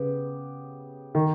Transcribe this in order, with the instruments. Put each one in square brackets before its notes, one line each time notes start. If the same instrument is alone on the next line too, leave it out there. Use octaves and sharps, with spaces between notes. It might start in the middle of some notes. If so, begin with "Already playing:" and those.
Already playing: [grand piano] C#3 [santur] B3 G4
[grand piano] D#3